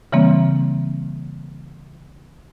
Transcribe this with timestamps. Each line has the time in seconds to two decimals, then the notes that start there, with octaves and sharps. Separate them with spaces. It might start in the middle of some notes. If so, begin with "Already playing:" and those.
0.12 C#3 E3 G3 A#3 C4